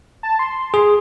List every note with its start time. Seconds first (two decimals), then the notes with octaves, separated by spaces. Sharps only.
0.23 A5
0.39 C6
0.74 G#4